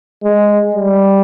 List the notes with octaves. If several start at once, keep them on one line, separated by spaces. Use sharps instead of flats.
G#3
G3